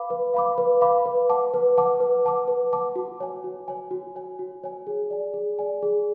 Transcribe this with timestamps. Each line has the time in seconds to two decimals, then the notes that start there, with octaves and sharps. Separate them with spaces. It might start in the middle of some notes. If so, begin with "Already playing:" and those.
Already playing: B4 F5 B5 D6
0.10 B4
0.34 F5 B5 D6
0.58 B4
0.81 F5 B5 D6
1.06 B4
1.29 F#5 A5 D6
1.54 B4
1.78 F#5 A5 D6
2.00 B4
2.25 F#5 A5 D6
2.48 B4
2.73 F#5 A5 D6
2.96 F#4
3.20 C#5 G#5
3.44 F#4
3.68 C#5 G#5
3.91 F#4
4.16 C#5 G#5
4.39 F#4
4.63 C#5 G#5
4.87 G#4
5.10 D5 G#5
5.34 G#4
5.59 D5 G#5
5.82 G#4